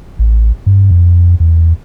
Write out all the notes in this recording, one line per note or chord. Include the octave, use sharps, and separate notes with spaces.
A1
G2
F2
E2